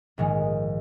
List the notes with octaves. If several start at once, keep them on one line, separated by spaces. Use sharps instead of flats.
A#1 G#2 D#3 G#3 D#4